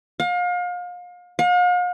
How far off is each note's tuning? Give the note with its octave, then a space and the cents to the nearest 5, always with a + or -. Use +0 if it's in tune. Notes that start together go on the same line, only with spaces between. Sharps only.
F5 +35
F5 +45